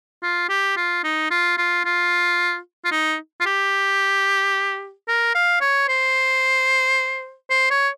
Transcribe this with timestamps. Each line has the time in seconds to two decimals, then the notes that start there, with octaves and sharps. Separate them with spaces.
0.22 F4
0.49 G4
0.76 F4
1.04 D#4
1.30 F4
1.58 F4
1.85 F4
2.85 F4
2.92 D#4
3.40 F4
3.46 G4
5.08 A#4
5.35 F5
5.61 C#5
5.88 C5
7.50 C5
7.71 C#5